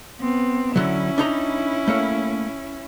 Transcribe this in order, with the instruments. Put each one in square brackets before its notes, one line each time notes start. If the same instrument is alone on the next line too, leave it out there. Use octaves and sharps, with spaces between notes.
[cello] B3 C4
[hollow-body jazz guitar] D3 F#3 [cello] C#4 E4
[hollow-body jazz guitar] D4 D#4 A#5
A3 A#3 C#5